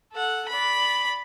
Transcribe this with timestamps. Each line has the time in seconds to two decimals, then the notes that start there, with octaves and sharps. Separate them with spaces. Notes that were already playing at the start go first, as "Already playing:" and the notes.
0.12 A4 F#5
0.48 D5 B5